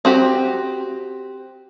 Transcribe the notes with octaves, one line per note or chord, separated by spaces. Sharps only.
C4 F#4 G4